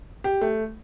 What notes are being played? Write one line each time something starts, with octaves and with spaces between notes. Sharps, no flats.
G4
A3